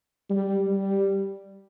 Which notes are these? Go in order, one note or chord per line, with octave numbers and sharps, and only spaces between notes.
G3
G3